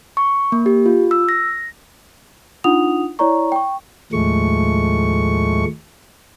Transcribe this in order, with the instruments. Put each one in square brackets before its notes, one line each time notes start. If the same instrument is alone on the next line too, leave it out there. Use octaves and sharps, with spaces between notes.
[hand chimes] C#6
A#3
G4
F4
E6
A#6
[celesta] D4 D#4 F4 F#5 D#6 F7
E4 C#5 D5 A#5 C#6
G5 C#6
[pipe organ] D#2 A2 F3 G#3 A3 C#6